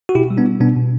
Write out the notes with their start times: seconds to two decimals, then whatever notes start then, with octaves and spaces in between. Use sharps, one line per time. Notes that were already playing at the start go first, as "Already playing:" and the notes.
0.09 F#4
0.15 B2 E4 G4
0.30 G3
0.37 B3 D4
0.46 G3
0.61 B2 B3 D4
0.77 B2